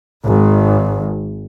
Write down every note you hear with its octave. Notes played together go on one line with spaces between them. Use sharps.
G#1